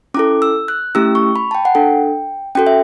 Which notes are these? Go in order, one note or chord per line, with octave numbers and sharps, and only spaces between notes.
C#4 E4 A4 D6
E6
F#6
A3 C#4 E4 G4 E6
C#6
B5
A5
G5
F#5
D4 A4 G5
C#4 F#4 A4 G5
E5